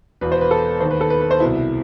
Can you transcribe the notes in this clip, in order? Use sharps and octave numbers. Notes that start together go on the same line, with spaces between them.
E1 E2 B2 B4
C5
B4
A4
D#2 D#3 C5
B4
A4
B4
B4
C5
C2 B2 E4